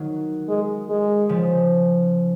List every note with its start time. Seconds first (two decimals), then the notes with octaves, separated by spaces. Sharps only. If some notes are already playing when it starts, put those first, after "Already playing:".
Already playing: D#3 F#3
0.49 G#3
0.89 G#3
1.29 C#3 F3